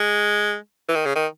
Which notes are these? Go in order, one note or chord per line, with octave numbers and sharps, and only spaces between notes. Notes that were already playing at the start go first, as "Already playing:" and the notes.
Already playing: G#3
E3
D#3
C#3
D#3